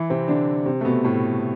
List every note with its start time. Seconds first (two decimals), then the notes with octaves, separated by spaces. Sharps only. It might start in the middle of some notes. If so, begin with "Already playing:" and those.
Already playing: E3 E4
0.10 C3 C4
0.28 D3 D4
0.66 C3 C4
0.81 A3
0.85 B2 B3
1.04 A2 A3